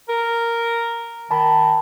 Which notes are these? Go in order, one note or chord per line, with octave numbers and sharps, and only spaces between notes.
A#4
D#3 A5 B5